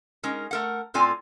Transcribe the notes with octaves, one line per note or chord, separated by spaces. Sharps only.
G#3 C#4 D#4 A#4
A3 A#4 F#5
A2 C4 F4 A4 D5 G#5